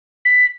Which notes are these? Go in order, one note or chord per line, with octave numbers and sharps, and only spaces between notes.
B6